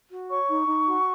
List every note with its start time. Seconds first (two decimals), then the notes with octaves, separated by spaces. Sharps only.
0.11 F#4
0.30 C#5 C#6
0.49 D#4
0.67 D#4
0.87 F#4